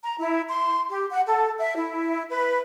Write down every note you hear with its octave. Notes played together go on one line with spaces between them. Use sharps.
A#5
E4
C6
G4
F#5
A4
E5
E4
B4